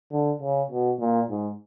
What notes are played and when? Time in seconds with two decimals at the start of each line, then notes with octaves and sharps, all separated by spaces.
0.12 D3
0.42 C#3
0.71 B2
1.00 A#2
1.30 G#2